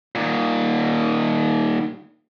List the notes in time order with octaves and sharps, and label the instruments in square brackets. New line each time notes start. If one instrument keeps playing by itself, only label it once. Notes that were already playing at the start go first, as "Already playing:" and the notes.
[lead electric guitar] A#2 D#3